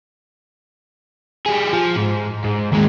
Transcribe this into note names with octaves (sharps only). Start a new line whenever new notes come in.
G3 G#4
F3
G#2
G#2
D#2 G#3